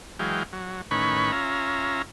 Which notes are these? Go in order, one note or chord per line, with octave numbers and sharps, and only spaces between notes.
E3 F#3 G#3 F5 G5
F#3
A2 D#3 C#4 B4 B5 C#6
C#4 F4 E5 A#5